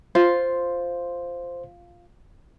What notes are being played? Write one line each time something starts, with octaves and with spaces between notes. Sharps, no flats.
F4 C5